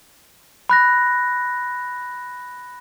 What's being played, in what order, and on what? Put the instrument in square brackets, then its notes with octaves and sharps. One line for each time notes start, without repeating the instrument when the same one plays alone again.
[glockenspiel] B5 F#6 A#6